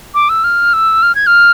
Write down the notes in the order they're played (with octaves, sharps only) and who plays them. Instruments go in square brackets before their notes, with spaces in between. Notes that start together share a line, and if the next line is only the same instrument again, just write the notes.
[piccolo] D6
E6
F6
E6
F6
G#6
F6